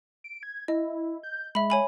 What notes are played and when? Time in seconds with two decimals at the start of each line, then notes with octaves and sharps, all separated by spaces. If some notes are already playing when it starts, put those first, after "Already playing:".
0.24 D7
0.43 G#6
0.68 E4 D#5
1.23 G6
1.55 G#3 E5 B5
1.70 C#5 G#5 B5